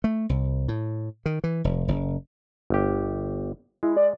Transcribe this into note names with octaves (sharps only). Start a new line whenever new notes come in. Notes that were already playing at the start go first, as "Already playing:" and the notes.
A3
C2
A2
D#3
E3
F1
F#1
G1 G4
G#3 E4
D5